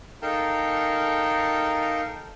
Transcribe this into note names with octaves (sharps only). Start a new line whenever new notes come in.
D#4 A4 A#4 F5 G5 A5